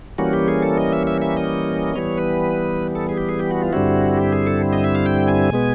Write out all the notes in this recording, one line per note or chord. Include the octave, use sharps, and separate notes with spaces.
E3 G3 A#3 C#4 F#4
G4
G#4
A4
D#5
E5
E5
E5
D#5
E3 G3 B3 C#5
B4
A4
G#4
G4
G#4
G4
F#4
F4
G2 D3 G3 C4 E4 F#4
G4
G#4
A4
D#5
E5
F5
G5
G#5
B2 G#3 B3